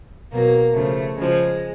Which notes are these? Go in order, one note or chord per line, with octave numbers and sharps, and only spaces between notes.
B2 F#3 A#3
C#3 F3 A3
C#3 F3 G#3